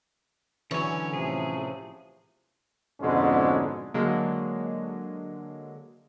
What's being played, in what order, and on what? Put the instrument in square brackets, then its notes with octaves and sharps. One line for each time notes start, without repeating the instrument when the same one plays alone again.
[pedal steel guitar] D3 C#5 [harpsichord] E3 F#3 [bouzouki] C#4
[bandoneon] A2 C3 F3 [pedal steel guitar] G#4
[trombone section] F2 G#2 B2 D3 G#3 C#4
[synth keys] D3 F#3 G#3 A#3